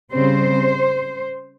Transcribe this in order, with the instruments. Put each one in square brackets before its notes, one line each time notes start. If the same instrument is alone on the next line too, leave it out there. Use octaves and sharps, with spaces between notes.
[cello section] C#3 G3 C4 C5